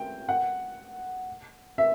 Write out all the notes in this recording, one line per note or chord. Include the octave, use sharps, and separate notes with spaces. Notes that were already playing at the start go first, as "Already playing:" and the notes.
Already playing: G5
F#5
E5